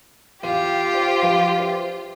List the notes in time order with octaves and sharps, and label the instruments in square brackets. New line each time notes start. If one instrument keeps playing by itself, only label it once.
[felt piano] E2 F5 D#7 [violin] F4 [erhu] G4
[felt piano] C5
F3 B4 F5
G4 C5 E5